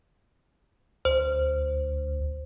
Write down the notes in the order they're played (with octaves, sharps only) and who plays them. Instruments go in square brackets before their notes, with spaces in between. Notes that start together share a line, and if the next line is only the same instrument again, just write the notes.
[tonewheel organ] D2 [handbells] C5